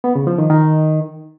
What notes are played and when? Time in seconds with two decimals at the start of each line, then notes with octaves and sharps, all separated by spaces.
0.04 B3
0.15 C#3
0.27 F3
0.38 D#3
0.50 D#3